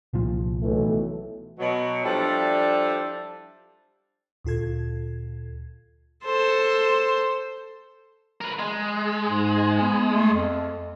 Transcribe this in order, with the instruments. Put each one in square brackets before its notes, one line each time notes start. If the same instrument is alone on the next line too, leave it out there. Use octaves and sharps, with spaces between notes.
[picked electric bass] C2 A#2 F3
[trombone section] B1 E3 A3
[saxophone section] B2 F#3
F3 G3 D4 E4 A4
[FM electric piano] D2 A#2 F4 A4 G#6
[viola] A4 C5
[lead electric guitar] A#4 B4
G#3
[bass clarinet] G#2
B3
A3
F2